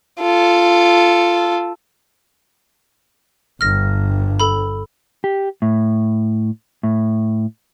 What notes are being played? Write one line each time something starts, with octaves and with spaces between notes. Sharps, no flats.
F4 A4
G1 G2 F6 A#6
A4 B5
G4
A2
A2